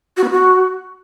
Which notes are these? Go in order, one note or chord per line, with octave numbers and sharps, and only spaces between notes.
F#4
B3
F#4